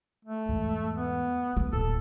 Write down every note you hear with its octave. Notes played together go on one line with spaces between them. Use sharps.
A3
E2 G#2
B3
D2 A3
D#1 A2 A4